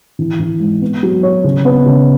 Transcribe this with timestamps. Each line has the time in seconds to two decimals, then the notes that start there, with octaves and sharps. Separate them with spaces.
0.19 E3
0.39 E3
0.60 G#2
0.82 B3
1.03 F#3
1.23 C#5
1.44 C#3
1.65 B3
1.86 C#3